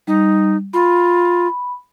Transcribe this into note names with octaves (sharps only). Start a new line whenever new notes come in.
G3 D#4
F4 B5